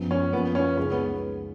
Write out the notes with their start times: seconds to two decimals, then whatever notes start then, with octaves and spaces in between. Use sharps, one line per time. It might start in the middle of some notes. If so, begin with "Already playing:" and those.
Already playing: F#2 F3 B3
0.11 C#4
0.33 F#2 F3 A#3 B3 F4
0.55 C#4
0.77 C#2 C#3 G#3 C#4 D#4 G#4
0.92 B3